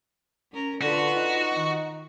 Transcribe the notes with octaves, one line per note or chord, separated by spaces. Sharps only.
C#4 A#4
D3 F4 F#4 A4 B4
D#4
D#3